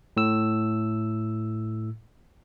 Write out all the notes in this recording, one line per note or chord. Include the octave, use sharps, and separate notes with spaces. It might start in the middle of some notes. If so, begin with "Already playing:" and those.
A2 E6